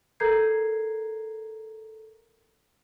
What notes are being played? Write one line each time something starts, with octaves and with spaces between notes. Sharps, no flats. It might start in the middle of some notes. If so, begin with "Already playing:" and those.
A4 A#4 A#5 G6 G#6 C7